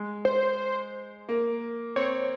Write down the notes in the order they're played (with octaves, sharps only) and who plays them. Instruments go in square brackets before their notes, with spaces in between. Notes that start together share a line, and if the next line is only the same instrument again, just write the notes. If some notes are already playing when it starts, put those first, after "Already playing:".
Already playing: [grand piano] G#3
[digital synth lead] C5
[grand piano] A#3
[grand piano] C4 [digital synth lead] C#5